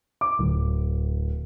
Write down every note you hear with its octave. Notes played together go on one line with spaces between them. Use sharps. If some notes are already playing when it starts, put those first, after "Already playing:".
D6
D1